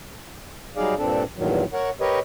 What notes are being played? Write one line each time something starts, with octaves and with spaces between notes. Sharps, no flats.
F#3 G3 D#4 G#4 D5 F5
G2 A#2 C4 D4 A4
E2 G2 A#2 D#3 F#3
A#4 C#5 F#5
G4 A#4 B4 C#5 D#5